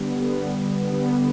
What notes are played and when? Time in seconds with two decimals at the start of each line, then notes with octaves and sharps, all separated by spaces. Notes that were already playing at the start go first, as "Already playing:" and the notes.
Already playing: D3 G3 B3
0.20 D3 G3 B3
0.92 D3 G3 B3